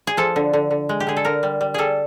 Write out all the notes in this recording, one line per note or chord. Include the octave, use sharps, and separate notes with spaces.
G#4
F3 A4
D3
D3
D3
G#3
G4
D3 G#4
A4
D3 A#4
G3
G3
G3 G#4 A4